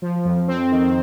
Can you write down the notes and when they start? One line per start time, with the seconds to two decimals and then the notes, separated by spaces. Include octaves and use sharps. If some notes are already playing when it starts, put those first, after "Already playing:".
0.02 F3
0.25 F2
0.48 C4
0.71 D#3